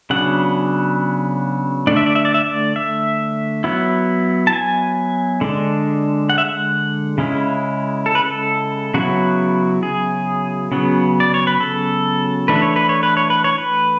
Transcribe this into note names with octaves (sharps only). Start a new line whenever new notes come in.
C#3 F#3 B3 D4 F#5
D3 A3 D4 D5
E5
D5
E5
D5
E5
D5
E5
F#3 B3 E4
A5
G#5
D3 G#3 D4
F#5
E5
F#5
C#3 G#3 C#4 E4
A4
B4
A4
C#3 F#3 B3 E4 F#4
G#4
C#3 F#3 B3
D5
C#5
B4
A4
E3 A3 D4 B4
C#5
B4
C#5
B4
C#5
B4
C#5
B4